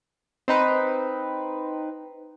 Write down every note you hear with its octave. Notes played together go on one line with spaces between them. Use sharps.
C4 D#4 B4